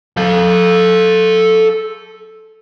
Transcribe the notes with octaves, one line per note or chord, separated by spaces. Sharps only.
A4 F5